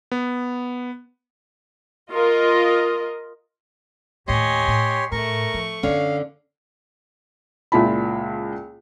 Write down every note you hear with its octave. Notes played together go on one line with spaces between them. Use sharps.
B3
F4 A#4 D#5
D#2 A2 G4 C#5 D#5 G#5 C6
A2
A2 A3 A#4 C#6
F3
F#2 D3 E3 C#4 F5
C#2 A#2 E4 A5 B5